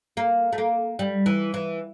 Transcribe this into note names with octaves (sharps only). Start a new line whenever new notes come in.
A#3
A3
A#3
G3
E3
E3